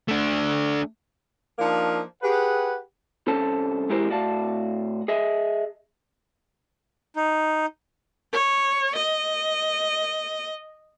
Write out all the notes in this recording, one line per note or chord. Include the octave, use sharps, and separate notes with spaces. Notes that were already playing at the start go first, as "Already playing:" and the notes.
A3 D4
F3 A#3 D4 D#4
G4 G#4 B4 F#5
C2 C#4 A4 C5 A5
E2 G#3 E4 G4 A#4 C5
A2 F#4 D5 F5 A5
G#4 D#5 E5
D#4
C#5
D#5